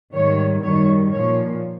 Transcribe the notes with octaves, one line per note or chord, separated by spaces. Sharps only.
G#2 D#3 G3 C#5
F#2 D#3 G3 C#5
A#2 F3 C#5